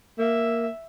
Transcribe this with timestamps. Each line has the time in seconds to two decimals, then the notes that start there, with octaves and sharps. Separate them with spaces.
0.19 A#3 E5